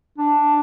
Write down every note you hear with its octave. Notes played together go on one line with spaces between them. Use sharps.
D4